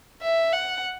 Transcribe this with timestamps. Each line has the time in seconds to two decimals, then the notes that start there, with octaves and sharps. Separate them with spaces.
0.22 E5
0.53 F#5